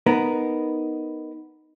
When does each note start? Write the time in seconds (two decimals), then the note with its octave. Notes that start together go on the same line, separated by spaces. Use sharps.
0.06 B3 D#4 A#4